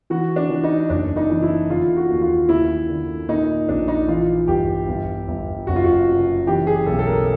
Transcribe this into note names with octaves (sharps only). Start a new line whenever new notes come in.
E3 F#4
D4
E3
D#4
F#1 D4
D#4
E3
E4
D3 F4
F#4
D#2
F4
D#2 E4
D3
A#2 D#4
A#1 D4
D#4
E3 F4
G1 G4
G1
G1
F#1 F#4
F4
F#4
C3
E3 G4
G#4
B1 A4
A4
A#4